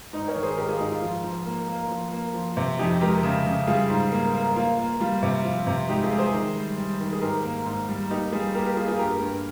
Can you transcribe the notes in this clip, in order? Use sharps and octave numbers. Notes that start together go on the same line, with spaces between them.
G#2 D#4
A#4 C#5
D#3
G#4 C5
G#2 G4 A#4
F4 G#4
G#2 D#4 G4
F4
F3 F4
F3
A#3
A#3
F3
A#3
F3
C3
F2 D#4 G4
G#3 G4 A#4
C#3
C#3
G3 F4 G#4
G#2
A#3
A#3
A#3 F4
A#3
G3 F4
C3
F3 F4
C3
G#3 D#4 G4
F4 G#4
G#3
G#4 C5
D#3
G3
G3
D#3
G#4
G#2 G4 A#4
A#3
G#2
G3
A#3 D#4 G4
G3 F4 G#4
A#3 G4 A#4
G4 A#4
A#3 F4 G#4
F4 G#4
G2 G4 A#4
G2